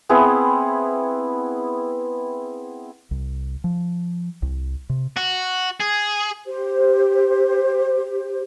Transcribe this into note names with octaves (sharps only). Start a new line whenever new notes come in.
B3 C4 E4 G#4
C2
F3
C2
C3
F#4
G#4
G4 C5